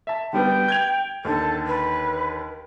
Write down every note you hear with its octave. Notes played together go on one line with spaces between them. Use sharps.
E5 A5
D3 G3 B3 G5
G6 G#6 F7
D#2 D3 A4
B4